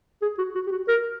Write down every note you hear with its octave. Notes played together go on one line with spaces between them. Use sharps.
G#4
F#4
F#4
G4
F#4
A#4